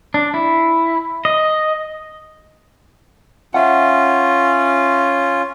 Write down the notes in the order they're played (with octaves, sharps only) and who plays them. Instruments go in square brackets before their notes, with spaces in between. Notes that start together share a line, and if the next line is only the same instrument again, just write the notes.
[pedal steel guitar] D4
E4
D#5
[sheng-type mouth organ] C#4 F4 [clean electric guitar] E5 F#5